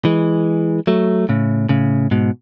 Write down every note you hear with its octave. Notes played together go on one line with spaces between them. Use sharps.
E3 G#3
F#3 A3
A2 C#3
A2 C#3
G#2 B2